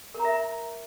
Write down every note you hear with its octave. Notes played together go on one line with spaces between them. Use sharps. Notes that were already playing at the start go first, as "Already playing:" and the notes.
A#4
A#5
E5
A#5